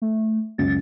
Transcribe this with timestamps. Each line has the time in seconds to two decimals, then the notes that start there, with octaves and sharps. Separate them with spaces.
0.02 A3
0.58 C#2 F#2 A6